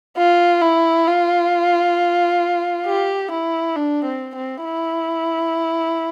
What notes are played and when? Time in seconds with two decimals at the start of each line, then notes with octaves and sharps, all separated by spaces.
0.17 F4
0.62 E4
1.07 F4
2.86 G4
3.31 E4
3.76 D4
4.05 C4
4.35 C4
4.65 E4